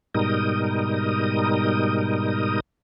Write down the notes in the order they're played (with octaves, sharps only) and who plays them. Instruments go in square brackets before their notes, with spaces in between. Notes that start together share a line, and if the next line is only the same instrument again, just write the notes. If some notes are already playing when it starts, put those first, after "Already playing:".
[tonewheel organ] G#2 B2 G3 D#4 A#4 D#6